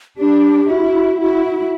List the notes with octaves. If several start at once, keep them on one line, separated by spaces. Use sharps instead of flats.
D4 G4
E4 F#4
E4 F#4